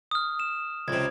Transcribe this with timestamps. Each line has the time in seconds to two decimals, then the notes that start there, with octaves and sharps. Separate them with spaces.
0.11 D#6 F6
0.40 E7
0.88 C#2 C3 G#6